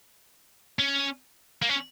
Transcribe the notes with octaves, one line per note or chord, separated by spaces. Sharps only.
C#4
A#3
C#4